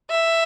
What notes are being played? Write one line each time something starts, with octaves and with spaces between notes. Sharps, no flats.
E5